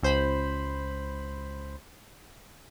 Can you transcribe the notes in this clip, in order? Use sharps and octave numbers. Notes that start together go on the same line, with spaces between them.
C#2 C5 B5